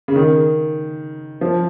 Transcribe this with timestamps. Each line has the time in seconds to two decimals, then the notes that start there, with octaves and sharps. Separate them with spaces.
0.08 C#3
0.16 D#3
1.41 F3